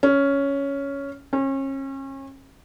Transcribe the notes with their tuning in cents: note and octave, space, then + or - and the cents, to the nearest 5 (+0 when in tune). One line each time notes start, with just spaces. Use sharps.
C#4 +5
C#4 -35